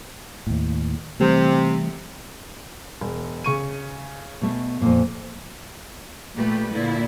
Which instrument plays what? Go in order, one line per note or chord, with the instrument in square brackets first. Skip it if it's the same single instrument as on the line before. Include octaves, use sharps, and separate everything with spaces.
[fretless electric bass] D#2 A2
[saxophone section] C3 [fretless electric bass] E3 G3 A3
[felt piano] E1
C#3 C#6 D#7
[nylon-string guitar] B2 A3
F2 A#2
[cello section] A#2 A3 G4 B4
A#2 D3 E4